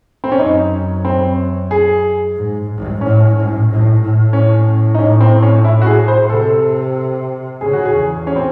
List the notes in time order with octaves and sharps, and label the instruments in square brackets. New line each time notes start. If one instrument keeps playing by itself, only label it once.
[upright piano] C4
C#4
[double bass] F#2 [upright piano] D#4
[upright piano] C4
G#4
[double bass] G#2
G#2
[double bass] A2 [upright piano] C#4
[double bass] A2
A2
A2
[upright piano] C#4
D#4
[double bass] A2 [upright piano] C#4
[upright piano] C4
C#4
E4
F#4
G#4
C5
[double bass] C3 [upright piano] A4
[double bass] C#3 [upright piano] G#4
[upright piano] F#4
G#4
[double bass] E2
[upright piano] C#4
C4